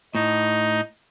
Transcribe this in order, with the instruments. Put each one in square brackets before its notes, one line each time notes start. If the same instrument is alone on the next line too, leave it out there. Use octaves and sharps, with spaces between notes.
[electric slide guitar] A2 [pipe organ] D#4